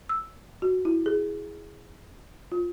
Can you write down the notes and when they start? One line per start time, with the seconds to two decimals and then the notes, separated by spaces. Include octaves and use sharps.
0.09 E6
0.62 F#4
0.85 E4
1.06 G#4
2.52 F4